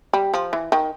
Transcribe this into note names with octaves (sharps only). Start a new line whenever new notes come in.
G3
F3
E3
D#3